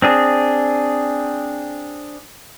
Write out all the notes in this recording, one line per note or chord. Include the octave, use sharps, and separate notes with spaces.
C4 D4 G#4